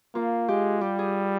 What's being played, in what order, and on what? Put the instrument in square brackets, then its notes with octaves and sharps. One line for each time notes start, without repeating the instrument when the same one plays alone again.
[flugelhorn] A#3 [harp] F4
[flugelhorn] G#3 [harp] G4
[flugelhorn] G3 [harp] G4
[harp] G#4